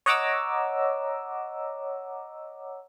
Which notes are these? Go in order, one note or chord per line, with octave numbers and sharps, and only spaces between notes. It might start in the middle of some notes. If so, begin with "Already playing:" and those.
C#5 D#5 F#5 A#5 D6 E6